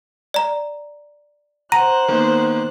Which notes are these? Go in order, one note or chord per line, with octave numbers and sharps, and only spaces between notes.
D5 A#5
C5 F#5 A#5 F#6 D#7
D#3 A#3 B3